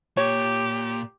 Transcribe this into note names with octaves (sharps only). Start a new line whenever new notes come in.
A#2 G4 C#5